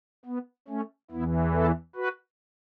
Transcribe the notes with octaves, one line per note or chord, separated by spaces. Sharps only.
B3
A3 C#4
E2 E3 B3 E4
E4 A4
F#4 B4